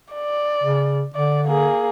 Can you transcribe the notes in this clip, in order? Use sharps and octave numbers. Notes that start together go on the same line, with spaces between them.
D5
C#3
D3 D5
A#3 G#4